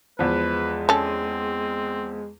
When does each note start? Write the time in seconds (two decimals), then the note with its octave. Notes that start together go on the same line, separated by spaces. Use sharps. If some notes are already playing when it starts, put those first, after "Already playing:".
0.19 E2 F3 G#3 B4
0.89 C4 C#4 A4